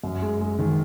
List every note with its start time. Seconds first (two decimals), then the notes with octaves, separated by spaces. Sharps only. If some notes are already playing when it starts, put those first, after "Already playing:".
0.04 F#2
0.22 G#3
0.40 G#3
0.59 D#3